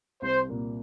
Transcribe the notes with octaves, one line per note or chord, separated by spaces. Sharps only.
C2 C5
A#2 A#3